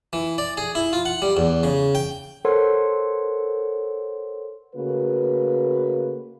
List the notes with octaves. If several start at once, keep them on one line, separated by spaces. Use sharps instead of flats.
E3
D5
G#4
E4
F4
F#5
G3
E2
C#3
G5
A4 A#4 C5 C#5 F#5 C6
C#3 A3 A#3 F#4 B4